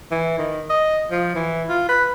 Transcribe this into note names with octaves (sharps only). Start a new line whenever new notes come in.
E3
D#3
D#5
F3
E3
F4
B4